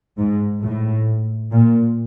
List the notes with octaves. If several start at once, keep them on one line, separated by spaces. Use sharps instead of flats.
G#2
A2
A#2